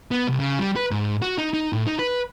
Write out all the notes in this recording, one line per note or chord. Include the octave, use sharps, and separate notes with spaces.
B3
C2
C#3
G3
B4
G#2
F#4
D#4
D#4
A2
D#4
B4